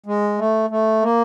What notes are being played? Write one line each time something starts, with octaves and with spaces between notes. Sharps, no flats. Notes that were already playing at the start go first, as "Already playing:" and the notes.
G#3
A3
A3
A#3